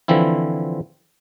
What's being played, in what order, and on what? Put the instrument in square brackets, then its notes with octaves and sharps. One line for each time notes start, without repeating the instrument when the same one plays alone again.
[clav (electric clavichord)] D3 E3 F3 C4 E4